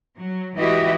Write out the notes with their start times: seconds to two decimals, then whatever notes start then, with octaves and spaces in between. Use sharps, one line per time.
0.18 F#3
0.57 E3 G#3 E4 F#4 G4 D#5